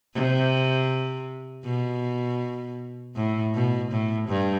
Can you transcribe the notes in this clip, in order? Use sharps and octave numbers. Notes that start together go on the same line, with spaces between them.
C3
B2
A2
B2
A2
G2